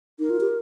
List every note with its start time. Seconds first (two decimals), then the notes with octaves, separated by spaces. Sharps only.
0.19 D#4 A#4
0.30 F4
0.40 G4